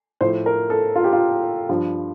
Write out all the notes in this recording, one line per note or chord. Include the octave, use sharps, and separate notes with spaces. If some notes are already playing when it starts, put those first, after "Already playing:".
A2 F3 C5
A#4
A4
F4
G4
F4
G2 F3